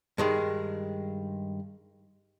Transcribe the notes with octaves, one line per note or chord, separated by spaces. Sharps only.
G2 D#3 G#3